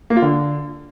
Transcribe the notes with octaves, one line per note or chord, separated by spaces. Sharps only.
A#3
F4
D3